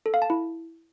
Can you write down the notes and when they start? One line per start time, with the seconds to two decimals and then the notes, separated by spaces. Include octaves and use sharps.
0.06 A4
0.14 F5
0.22 A5
0.30 E4